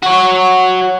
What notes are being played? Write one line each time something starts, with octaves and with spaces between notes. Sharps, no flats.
F#4 C#5